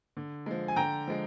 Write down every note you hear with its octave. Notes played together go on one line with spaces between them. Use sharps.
D3
F3 G#3
G#5
D3 G5 A#5
F3 G#3